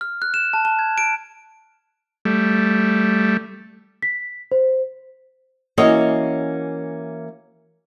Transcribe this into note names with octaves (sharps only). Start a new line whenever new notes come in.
F6
F#6
E7
A5
A5
G#6
D7
G3 A3
B6
C5
E3 A#3 C#4 F#4 C#5 D#5